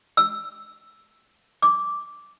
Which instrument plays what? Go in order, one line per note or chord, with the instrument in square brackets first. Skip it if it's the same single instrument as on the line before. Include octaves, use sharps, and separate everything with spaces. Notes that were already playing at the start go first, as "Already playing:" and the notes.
[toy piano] E6
D6